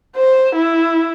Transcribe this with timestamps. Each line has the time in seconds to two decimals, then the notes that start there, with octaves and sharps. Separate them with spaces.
0.16 C5
0.55 E4